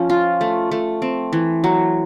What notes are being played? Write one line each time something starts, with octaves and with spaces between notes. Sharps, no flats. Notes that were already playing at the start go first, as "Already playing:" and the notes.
Already playing: F3 C#4
F4
A3
A3
C4
E3
F#3